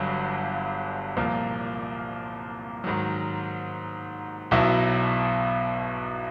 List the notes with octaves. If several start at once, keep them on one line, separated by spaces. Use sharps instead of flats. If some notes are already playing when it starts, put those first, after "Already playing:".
Already playing: G1 G2 D3 F#3
C2 A#2 F3 A#3
G#2 D#3 F#3
B1 B2 F#3 B3 E4